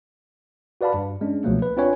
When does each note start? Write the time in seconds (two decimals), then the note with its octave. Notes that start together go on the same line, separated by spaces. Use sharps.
0.81 F#4 B4 D5 F5 A5 B5
0.94 G2
1.21 G#3 C#4 D4
1.44 C#2 B2 F3 F#3 A3 A#3
1.62 B4
1.77 C4 D4 F4 B4 C#5 G#5